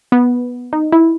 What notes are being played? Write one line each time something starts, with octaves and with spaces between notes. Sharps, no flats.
B3
D#4
E4